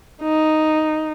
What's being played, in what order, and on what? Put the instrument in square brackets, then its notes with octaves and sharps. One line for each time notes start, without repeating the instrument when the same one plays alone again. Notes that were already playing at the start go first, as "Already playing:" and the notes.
[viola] D#4